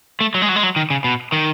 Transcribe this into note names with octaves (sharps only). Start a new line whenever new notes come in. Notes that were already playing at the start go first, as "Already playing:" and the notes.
A3
F#3
G#3
F#3
G#3
F#3
D#3
C#3
B2
D#3